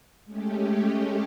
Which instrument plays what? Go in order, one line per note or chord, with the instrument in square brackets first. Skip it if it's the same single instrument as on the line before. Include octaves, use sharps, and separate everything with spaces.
[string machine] G#3 A3 C#4 G4